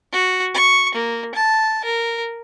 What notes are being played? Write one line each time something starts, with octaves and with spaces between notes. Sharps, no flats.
F#4
C#6
A#3
A5
A#4